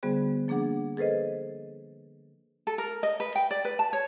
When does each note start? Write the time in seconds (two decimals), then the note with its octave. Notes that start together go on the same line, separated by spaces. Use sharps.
0.03 D3 G3 B3 F#4 G#4 C5
0.48 F3 A#3 D4 G#4 F#5 D6
0.97 G#4 A4 B4 C5 D#5
2.67 A4
2.78 A#4
3.03 D#5
3.20 B4
3.35 G5
3.51 D5
3.65 B4
3.79 A5
3.93 C#5